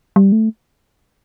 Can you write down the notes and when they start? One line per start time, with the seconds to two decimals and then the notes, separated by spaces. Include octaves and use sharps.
0.16 G3
0.32 A3